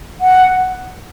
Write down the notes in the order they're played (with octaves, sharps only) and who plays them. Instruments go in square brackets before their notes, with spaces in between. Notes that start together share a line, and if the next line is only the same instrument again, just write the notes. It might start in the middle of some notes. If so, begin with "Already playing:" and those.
[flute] F#5